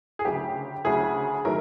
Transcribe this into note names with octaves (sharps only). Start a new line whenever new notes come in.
G#4
D2 C#3 F#3 A3 G4
D2 C#3 F#3 A3 G#4
D#3 F#3 A3 A#4